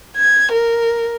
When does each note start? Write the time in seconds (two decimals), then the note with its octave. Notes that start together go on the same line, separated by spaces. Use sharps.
0.17 G#6
0.52 A#4